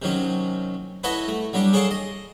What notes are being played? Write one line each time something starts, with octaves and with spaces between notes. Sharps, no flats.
C3 D#3 F#3 C#4
E4 F#4 A4 B4 C#5 D#5
A3
F#3 G3 D4 G4
G#4 A4 C#5 D5 F5 A5
D#5